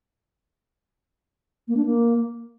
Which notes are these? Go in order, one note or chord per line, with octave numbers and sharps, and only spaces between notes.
A#3
D4
A#3